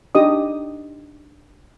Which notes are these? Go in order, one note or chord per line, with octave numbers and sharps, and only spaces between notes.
D4 D#4 G4 D#5 D#6